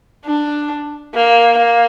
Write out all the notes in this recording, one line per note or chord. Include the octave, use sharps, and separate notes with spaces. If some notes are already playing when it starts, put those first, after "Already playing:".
D4
A#3
A#3